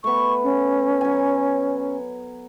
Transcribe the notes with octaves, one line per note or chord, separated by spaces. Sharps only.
A3 B3 C#6
C#4
F#3 G#5